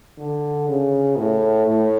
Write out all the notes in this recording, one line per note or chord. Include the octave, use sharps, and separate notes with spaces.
D3
C#3
A2
A2